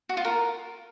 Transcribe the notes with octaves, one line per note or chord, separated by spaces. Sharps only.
F#4
F4
A#4